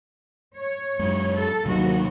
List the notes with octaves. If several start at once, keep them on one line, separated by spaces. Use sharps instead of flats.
C#5
F#2 G#3
A4
D#2 C3 F#3 G3 F#4